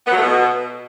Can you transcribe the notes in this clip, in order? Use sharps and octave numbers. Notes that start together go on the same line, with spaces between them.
B3
F#3
A3
B2